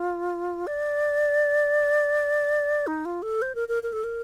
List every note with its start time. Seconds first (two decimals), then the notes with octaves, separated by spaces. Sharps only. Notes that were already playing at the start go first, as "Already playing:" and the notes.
Already playing: F4
0.67 D5
2.87 D#4
3.05 F4
3.22 A4
3.42 C5
3.55 A#4
3.68 A#4
3.83 A#4
3.93 A4
4.04 A#4